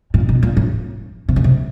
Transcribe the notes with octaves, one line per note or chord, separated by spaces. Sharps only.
A#2
B2
A#2
A2
C3
C#3
C3